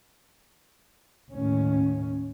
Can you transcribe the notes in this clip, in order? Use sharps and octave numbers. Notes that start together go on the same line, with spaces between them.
D#2 A2 D#3 C#4